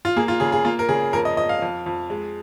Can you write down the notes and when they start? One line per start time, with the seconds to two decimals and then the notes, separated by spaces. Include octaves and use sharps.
0.05 F4
0.16 A#3 G#4
0.28 F4
0.40 C#3 G#4
0.52 G#4
0.65 A#3 F4
0.79 A#4
0.89 C#3 G#4
1.13 F2 A#4
1.25 D#5
1.37 F2 D#5
1.49 F5
1.62 F2
1.86 F2
2.10 G#3